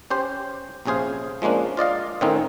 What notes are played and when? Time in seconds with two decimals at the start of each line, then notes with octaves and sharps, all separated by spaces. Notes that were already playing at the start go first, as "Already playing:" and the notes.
0.10 C#4 G4 C5
0.86 A#1 C3 C#4 G#4 C5 F5
1.42 F3 G#3 A#3 C#4 D4
1.77 F4 D5 D#5 F5
2.21 A2 D#3 C4 C#4 D#4